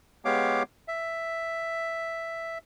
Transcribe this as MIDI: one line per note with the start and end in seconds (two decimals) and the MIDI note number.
0.25 0.63 56
0.25 0.63 59
0.25 0.63 67
0.25 0.63 73
0.25 0.63 77
0.25 0.63 86
0.88 2.58 76